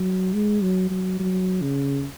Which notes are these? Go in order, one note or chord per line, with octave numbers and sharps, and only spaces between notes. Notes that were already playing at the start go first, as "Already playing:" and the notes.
Already playing: F#3
G#3
F#3
F#3
F#3
C#3